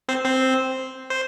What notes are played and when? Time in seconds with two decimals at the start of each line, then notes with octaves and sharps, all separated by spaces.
0.08 C4 C5
0.25 C4 C5
1.10 C5